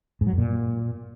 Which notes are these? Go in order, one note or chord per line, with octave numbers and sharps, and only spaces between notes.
G#2
F#3
F#2
A#2